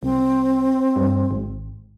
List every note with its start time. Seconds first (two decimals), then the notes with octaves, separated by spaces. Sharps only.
0.03 C2 C4
0.96 G2
1.31 G#1